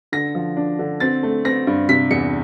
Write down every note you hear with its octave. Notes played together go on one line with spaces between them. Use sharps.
D3 A#6
F3
D4
D3
C4 A6
A3
C4 A#6
G2
C3 B6
E2 C#7